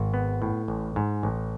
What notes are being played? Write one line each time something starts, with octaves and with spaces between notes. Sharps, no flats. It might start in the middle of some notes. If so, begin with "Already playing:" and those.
Already playing: G#1
B3
A2
A1
G#2
A1